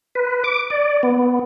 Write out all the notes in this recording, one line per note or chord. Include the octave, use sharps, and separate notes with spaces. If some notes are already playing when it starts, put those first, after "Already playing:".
B4
D6
D5
B3